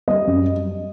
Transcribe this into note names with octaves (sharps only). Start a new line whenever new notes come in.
G3 D#5
F#2